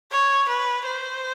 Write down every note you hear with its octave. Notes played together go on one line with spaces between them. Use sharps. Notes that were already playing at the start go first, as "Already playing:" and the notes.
C#5
B4
C5